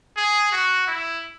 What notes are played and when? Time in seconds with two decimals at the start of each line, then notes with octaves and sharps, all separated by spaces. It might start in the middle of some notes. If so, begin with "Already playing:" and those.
0.17 G#4
0.52 F#4
0.87 E4